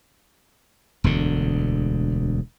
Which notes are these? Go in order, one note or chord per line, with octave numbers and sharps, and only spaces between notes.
E1 D2 D3